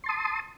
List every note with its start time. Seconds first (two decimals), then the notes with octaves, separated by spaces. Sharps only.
0.04 C6
0.06 A5
0.09 D#6